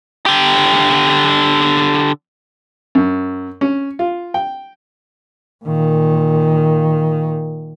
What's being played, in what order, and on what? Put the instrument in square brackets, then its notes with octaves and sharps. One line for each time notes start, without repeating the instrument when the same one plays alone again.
[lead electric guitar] D3 G4
[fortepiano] F#2
C#4
F4
G5
[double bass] A#2 D#3